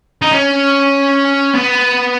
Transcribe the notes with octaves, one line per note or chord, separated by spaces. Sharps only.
D#4
C#4
B3